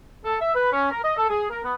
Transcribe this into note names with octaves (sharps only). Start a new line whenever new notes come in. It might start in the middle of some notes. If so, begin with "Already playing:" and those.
A4
E5
B4
C#4
A#4
D#5
A4
G#4
A#4
B3